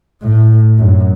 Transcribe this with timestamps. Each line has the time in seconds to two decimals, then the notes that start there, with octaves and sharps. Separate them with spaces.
0.23 A2
0.78 F#2